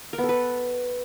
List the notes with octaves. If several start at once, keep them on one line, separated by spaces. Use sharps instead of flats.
A#4
B3
A4
B4